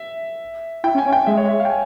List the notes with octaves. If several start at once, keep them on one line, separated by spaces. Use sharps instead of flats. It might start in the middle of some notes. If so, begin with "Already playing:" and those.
Already playing: E5
E4 G5
C#4
G#5
C#4
G5
G#3 E5
C#5
E5
F5
G5
G#5